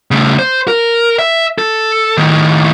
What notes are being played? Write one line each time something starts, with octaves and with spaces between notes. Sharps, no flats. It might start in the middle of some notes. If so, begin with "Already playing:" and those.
C#3 A3
C5
A#4
E5
A4
A2 D#3